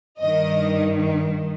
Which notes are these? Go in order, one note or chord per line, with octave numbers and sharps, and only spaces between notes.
G2 D#3 D#5